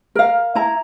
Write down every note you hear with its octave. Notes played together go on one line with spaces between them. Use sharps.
A#4 F5
E4 A#5